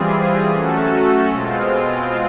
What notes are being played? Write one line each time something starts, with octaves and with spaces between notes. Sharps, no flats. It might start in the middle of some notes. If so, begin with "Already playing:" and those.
Already playing: E3 G3 C4 F4 G#4
F#3 A3 C#4 F#4 A4
B2 G#3 C4 F4